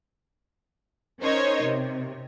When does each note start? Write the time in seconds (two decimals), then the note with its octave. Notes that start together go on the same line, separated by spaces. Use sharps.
1.23 C#4 D#4 A#4 C5 C#5 D#5
1.63 C3